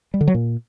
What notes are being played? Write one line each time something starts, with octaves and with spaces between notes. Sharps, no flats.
G3
D3
F#3
A#2